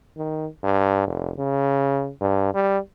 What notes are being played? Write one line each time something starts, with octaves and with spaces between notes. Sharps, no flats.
D#3
G2
F1
C#3
G2
G3